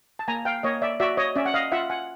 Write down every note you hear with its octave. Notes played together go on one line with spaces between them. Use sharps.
A5
A#3 G#5 A#5
F5 G5
A#3 C#5 D#5
D5 E5
F#4 D5 E5
C#5 D#5
C#4 D5 E5
F#5
D#5 F5
F4 E5 F#5
F#5 G#5